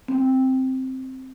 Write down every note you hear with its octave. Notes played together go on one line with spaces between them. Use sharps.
C4